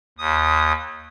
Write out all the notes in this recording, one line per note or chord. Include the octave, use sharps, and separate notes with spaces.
D#2 D#6